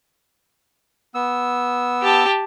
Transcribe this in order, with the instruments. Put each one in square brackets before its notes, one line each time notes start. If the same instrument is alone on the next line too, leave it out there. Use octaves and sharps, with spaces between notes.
[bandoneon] B3 E6
[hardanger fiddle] G4 A5